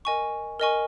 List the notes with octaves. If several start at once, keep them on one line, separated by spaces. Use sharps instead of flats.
A#4 D#5 G#5 C#6
A#4 D#5 G#5 C#6